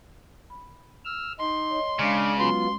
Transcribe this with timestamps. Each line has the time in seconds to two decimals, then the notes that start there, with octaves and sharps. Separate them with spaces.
0.50 B5
1.05 E6 F6
1.39 D#4 C6
1.70 C#5 D#5
1.99 C#3 G#3 D4 F5 D6
2.39 F#3 B3 C#4 F4 C6